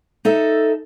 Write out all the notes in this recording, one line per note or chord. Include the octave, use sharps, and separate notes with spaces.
D#4 A4 E5